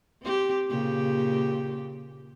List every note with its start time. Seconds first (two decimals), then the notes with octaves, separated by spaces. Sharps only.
0.22 C4 G4
0.70 A#2 C#3 G4